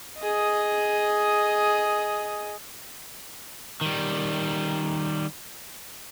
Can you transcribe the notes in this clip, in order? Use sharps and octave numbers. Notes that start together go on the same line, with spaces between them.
G#4 D#5
D#3 G3